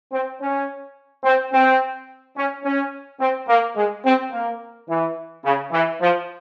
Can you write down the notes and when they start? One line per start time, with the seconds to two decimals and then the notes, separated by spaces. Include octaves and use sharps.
0.11 C4
0.40 C#4
1.24 C4
1.52 C4
2.36 C#4
2.64 C#4
3.19 C4
3.48 A#3
3.75 G#3
4.04 C4
4.31 A#3
4.88 E3
5.44 C#3
5.72 E3
6.00 F3